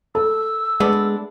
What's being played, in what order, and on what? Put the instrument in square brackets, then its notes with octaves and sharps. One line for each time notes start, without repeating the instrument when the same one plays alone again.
[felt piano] A4 [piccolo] E6
[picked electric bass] G#3 [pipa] A3 B3 D4